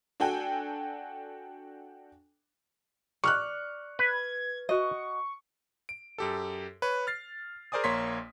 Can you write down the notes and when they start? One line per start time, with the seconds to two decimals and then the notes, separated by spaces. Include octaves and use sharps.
0.20 D4 F#4 A4 G5 G#5
3.24 D5 C#6 F6 F#6
3.99 B4 G#6
4.69 F#4 D#5 C#6
5.89 D7
6.18 F#2 G4 A4
6.82 B4 C#5
7.07 F6 A6 C7
7.72 G#4 A#4 C5 D5 G#5 D#6
7.84 A#1 A#3 C#5 A#5 C6 B6